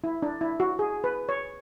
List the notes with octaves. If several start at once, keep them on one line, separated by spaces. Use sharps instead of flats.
E4
D4
E4
F#4
G#4
B4
C#5